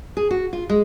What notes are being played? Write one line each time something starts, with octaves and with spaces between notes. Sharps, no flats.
G#4
F#4
F4
G#3